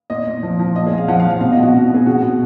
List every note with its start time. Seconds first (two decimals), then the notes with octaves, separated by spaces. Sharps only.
0.10 A#2 D#5
0.27 A#2
0.43 F3
0.59 F3
0.75 A#2 D#5
0.87 G#4
0.91 A#2
0.98 F5
1.08 F3 F#5
1.20 F5
1.25 F3
1.30 F5
1.41 B2 F5
1.52 D#5
1.57 B2
1.63 F#4
1.74 B2
1.90 B2 G#4
2.06 B2 F#4
2.23 B2